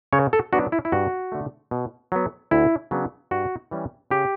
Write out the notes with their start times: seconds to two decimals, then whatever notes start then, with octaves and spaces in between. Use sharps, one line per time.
0.13 C#3 C#5
0.33 A4
0.53 F#3 B3 D4 F#4
0.72 E4
0.85 E4
0.92 G2 F#4
1.32 D3 A3
1.71 B2
2.12 F#3 B3
2.51 D2 E4
2.91 C#3 F#3 B3 D4
3.31 G2 F#4
3.71 E3 G3 C#4
4.11 C#3 G4